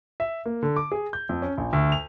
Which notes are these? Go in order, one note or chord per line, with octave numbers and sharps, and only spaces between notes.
E5
A#3
D3
D6
G#4
G6
F2
C#4
A#1
D2
F7